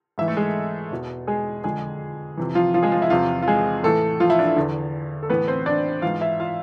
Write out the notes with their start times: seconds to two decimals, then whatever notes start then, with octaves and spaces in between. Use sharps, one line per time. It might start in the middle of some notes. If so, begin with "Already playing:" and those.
0.18 G#2 E3 E4 E5
0.28 A3 A4
0.37 G#3 G#4
0.91 E2 B2
1.27 G#3 G#4
1.64 F2 D3 G#3 G#4
2.37 F2 C3 E3
2.55 F3 F4
2.74 F3 F4
2.83 G#3 G#4
2.92 F3 F4
3.02 E4
3.10 E2 C3 E3 F3 F4
3.42 F4
3.48 G#3 G#4
3.83 A2 E3 A3 A4
4.20 F3 F4
4.30 E4
4.39 D4
4.47 E4
4.57 E2 D3
5.23 A4
5.30 A2 E3 B3 B4
5.48 C4 C5
5.66 D4 D5
6.02 G#2 E3 F4 F5
6.21 E4 E5
6.40 F4 F5